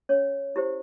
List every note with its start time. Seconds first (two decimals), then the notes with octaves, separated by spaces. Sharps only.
0.09 C#4 C#5
0.56 E4 G4 C5